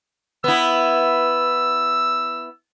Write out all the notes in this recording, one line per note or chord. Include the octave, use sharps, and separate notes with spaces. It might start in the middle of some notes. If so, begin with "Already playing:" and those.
B3 E4 E6